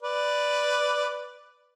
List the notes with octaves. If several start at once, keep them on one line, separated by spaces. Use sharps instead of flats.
B4 D5